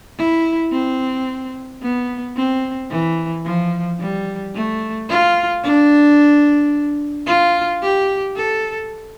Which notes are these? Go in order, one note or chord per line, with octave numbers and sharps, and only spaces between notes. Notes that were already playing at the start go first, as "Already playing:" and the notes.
E4
C4
B3
C4
E3
F3
G3
A3
F4
D4
F4
G4
A4